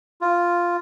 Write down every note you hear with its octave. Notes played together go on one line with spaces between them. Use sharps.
F4